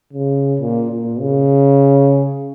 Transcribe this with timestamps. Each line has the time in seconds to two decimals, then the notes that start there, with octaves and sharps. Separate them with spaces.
0.13 C#3
0.60 A#2
0.91 A#2
1.20 C#3